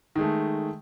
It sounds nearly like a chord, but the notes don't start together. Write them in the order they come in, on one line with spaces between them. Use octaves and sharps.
D#3 G#3 A3